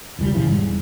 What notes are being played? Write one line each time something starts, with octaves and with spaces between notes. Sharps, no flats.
E1 C#2 D#3 G3
A#2 C#3 E3 F3
E1 G#2 G3